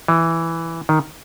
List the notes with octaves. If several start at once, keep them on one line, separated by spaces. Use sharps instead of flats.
E3
D#3